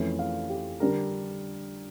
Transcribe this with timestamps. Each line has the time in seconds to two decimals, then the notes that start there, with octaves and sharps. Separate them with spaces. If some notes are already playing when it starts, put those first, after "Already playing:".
Already playing: F2 E3 A3 C#4
0.19 F5
0.50 G4
0.80 D3 G3 D4 A#4